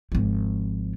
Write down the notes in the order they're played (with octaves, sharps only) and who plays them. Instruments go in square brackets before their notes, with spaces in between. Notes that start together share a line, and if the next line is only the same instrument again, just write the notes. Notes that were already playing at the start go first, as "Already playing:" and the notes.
[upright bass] G#1 F3